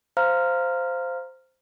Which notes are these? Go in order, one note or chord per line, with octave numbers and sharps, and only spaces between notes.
C5 F5 A#5 F6